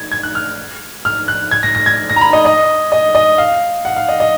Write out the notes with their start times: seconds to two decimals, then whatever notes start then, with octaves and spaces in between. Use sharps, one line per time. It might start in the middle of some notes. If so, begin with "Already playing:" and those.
Already playing: G#6
0.12 G#6
0.23 F#6
0.35 F6
1.05 F6
1.28 F#6
1.51 G#6
1.63 A#6
1.75 A#6
1.86 G#6
2.10 A#6
2.16 A#5
2.21 B5
2.33 D#5
2.45 D#5
2.92 D#5
3.15 D#5
3.38 F5
3.85 F#5
3.96 F5
4.08 D#5
4.20 D#5